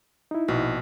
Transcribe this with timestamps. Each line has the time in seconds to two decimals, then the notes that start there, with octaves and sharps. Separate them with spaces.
0.31 D#4 E4
0.48 A#1 B2